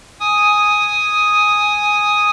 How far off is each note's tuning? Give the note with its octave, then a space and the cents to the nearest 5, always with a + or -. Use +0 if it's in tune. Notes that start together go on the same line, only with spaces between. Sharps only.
G#5 +0 D#6 +5